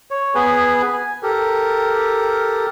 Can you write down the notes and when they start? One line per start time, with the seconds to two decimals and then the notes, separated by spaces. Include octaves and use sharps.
0.11 C#5
0.35 B3 G#4 B4 G#5
0.93 G#5
1.23 G4 A4 A#4